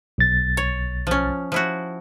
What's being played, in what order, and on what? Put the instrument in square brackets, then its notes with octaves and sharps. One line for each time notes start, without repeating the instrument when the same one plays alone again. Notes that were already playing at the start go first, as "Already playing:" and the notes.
[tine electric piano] B1 A6
[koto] C#5
F3 C#4
F3 E4 F#4